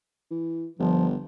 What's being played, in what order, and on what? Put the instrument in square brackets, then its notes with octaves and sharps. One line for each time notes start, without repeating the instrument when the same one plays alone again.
[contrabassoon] E3
[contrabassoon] G1 [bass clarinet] F3